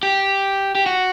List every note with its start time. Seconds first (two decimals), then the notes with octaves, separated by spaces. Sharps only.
0.03 G4
0.75 G4
0.86 F#4